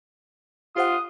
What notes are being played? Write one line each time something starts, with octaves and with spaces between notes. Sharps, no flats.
F4 G4 C5 F#5 D#6